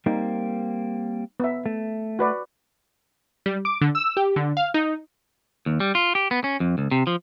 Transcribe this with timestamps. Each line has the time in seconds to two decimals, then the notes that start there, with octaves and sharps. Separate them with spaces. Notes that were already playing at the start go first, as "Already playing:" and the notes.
0.06 G3 A#3 C4 D#4
1.40 B3 E5
1.66 A3
2.19 F#4 B4 D5
3.46 G3
3.65 D6
3.81 D3
3.95 E6
4.17 G4
4.36 D3
4.57 F5
4.74 D#4
5.66 D#2
5.80 G3
5.95 F4
6.15 G4
6.31 B3
6.44 C#4
6.60 F2
6.78 C#2
6.91 C3
7.07 F3